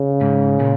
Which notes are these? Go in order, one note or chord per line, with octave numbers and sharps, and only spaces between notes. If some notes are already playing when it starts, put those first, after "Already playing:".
Already playing: C#3
G#2
A#2